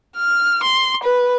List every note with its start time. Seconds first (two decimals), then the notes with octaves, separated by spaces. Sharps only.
0.16 F6
0.63 C6
1.03 B4